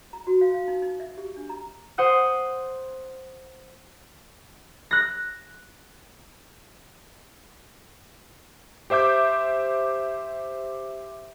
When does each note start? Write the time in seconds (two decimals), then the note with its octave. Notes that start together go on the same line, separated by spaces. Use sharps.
0.13 A#5
0.27 F#4
0.41 F5
0.54 F5
0.68 D#4
0.82 D#4
1.00 E5
1.18 G4
1.36 D4
1.49 A#5
1.98 C5 F#5 D#6 F#6
4.91 F#6 A#6
8.90 G4 C5 E5 D6 G6